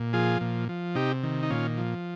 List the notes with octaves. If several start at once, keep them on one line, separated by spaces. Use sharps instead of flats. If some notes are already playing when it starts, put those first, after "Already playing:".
Already playing: A#2
F3 F4 G#4
A#2
F3
C3 D#4 G4
D#3
D#4
A#2 C#4 F4
F3